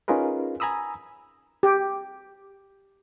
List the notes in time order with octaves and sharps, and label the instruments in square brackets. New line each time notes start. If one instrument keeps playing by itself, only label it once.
[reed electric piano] C#4 D#4 F4 G#4 A#4 B4
G#5 A#5 B5 D#6 E6
[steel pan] G4